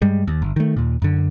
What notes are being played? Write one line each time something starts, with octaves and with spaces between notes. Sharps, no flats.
G2 G3 G#3
D#2
G1
D#3 A3
D#2 A#2
F#2 D3